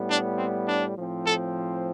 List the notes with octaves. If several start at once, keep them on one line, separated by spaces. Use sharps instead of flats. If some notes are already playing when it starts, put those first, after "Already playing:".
Already playing: A2 G3 B3
D4
C4
D4
A2 F3 C4
A4